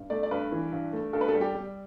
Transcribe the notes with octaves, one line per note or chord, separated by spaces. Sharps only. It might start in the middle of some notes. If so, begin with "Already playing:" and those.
Already playing: G2
A3 D5
D5
G2 B4
E3
G2
A3
G2 A4
B4
A4
G3
G4
G3